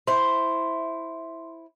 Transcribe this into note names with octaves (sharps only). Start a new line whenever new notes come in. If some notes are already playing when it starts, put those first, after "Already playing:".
E4 C5 C6